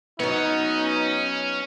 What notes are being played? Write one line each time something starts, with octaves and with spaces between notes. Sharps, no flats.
F#3 B3 C#4 D#4 C#5